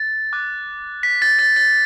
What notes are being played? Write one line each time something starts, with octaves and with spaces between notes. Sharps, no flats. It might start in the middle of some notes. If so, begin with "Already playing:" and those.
Already playing: A6
D6 F#6
B6
A6
A6
A6